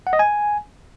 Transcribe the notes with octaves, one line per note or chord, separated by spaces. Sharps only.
F#5
D#5
G#5